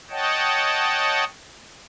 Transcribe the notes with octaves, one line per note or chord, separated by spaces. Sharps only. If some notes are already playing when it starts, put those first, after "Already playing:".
C#5 D#5 F#5 G5 A5